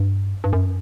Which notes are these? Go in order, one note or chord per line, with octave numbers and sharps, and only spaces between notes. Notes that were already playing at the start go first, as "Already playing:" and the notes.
Already playing: G2
G2
F#2